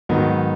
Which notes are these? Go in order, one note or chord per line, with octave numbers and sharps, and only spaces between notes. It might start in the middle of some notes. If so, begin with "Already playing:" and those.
G#2 D#3 F#3 B3 D#4